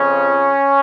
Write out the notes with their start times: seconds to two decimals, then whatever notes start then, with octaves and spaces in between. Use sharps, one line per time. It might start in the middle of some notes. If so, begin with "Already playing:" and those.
Already playing: F2 C#3 F3 C#4